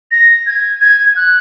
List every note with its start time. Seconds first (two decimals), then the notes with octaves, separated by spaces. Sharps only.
0.11 A#6
0.46 G#6
0.81 G#6
1.16 F#6